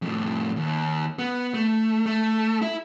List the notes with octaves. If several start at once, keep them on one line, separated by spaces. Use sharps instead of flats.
F2 A2
D#2
B3
A3
A3
E4 E5